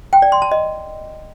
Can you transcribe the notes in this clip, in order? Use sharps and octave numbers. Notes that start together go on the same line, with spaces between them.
G5
D5
C6
A5
D#5